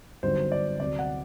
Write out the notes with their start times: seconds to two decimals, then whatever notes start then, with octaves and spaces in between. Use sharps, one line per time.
0.23 G1 G2 F#3 C4 D#4 C5
0.52 D5
0.79 D2 C3 F#3 D5
0.99 F#5